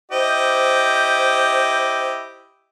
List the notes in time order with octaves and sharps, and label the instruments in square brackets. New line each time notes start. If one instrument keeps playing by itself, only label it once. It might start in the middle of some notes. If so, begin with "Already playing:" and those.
[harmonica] E4 G4 D#5 [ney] C5